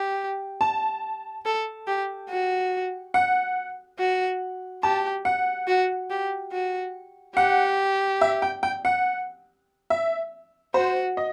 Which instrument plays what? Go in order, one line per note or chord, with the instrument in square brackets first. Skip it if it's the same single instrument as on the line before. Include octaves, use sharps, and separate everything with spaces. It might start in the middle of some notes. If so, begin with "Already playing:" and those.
Already playing: [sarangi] G4
[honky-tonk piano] A5
[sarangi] A4
G4
F#4
[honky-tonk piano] F#5
[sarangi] F#4
[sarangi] G4 [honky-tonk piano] A5
[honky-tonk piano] F#5
[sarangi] F#4
G4
F#4
[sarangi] G4 [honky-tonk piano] F#5
[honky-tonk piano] E5
G5
G5
F#5
E5
[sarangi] F#4 [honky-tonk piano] C5
[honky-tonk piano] D#5